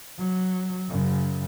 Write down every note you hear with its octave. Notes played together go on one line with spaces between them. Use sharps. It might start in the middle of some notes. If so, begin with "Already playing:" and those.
F#3
F#2 C#3